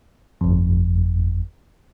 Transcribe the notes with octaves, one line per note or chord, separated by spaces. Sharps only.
G1 F2